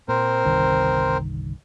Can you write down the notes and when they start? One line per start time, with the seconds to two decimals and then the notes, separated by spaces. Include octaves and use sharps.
0.08 A#2 C4 A#4 C5
0.45 G1 C2 D#3